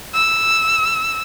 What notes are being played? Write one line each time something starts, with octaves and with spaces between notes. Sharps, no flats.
E6